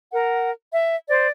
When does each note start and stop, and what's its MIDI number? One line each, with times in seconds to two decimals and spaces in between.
0.13 0.51 70
0.13 0.51 78
0.73 0.96 76
1.08 1.28 72
1.08 1.28 74